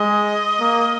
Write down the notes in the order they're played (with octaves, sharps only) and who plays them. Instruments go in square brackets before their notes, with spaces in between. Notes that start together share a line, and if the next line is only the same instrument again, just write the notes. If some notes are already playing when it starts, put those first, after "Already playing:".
Already playing: [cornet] G#3 [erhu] D#5
[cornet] A#3